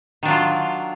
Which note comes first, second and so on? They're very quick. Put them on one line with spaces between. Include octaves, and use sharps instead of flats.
D#3 D4 F#3 F4